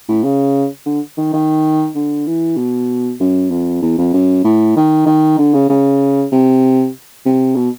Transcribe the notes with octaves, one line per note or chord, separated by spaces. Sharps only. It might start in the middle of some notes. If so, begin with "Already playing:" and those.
A2
C#3
D3
D#3
D#3
D3
E3
B2
F#2
F2
E2
F2
F#2
A2
D#3
D#3
D3
C#3
C#3
C3
C3
B2